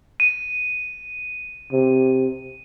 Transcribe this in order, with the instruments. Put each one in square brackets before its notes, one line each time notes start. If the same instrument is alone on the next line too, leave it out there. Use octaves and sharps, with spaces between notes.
[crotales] D#7
[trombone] C3